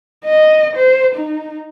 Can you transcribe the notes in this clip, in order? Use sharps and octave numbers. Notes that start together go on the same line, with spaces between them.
D#5
C5
D#4